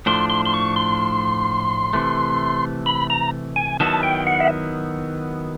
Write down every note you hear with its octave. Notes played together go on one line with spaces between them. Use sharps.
A2 F3 A3 D4 C6
C6
C6
C#6
C6
C3 E3 A3
B5
A#5
G#5
D#3 F#3 B3 E4 A5
G5
F#5
E5